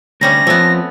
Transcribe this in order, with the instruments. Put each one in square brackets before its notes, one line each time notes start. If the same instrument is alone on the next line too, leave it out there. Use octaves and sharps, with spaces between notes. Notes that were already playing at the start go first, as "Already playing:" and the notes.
[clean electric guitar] D2 [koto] C3 G3 C#4 [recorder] A#6
[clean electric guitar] F2 G#2 F3 [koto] A3 B3